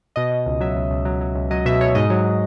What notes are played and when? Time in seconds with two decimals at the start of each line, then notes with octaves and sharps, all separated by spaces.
0.16 B2 D#5
0.32 B2
0.46 C#2
0.60 F#3 E5
0.76 C#2
0.90 C#2
1.05 F#3
1.21 F#3
1.35 C#2
1.51 F#3 D#5
1.65 B2 E5
1.81 B2 C#5
1.95 G#2 D#5
2.10 F#3